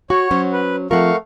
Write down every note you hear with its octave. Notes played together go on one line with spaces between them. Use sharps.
F#4 C#5 F#5 C#6
F#3 C#4 C5
B4
F3 A3 C4 F4 A#4 F5 F#5 C#6